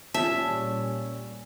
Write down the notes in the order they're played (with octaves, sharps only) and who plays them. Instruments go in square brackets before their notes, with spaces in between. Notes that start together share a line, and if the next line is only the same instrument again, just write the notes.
[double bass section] A#2 G3 C#4 [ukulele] F4 G#4 A5 [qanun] E5